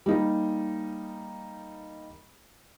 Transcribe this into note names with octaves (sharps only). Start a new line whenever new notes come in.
G3 A#3 D#4